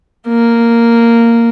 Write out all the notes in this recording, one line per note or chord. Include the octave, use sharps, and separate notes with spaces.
A#3